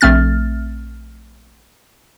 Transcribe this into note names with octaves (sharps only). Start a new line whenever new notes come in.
A#1 A3 C4 F6 A6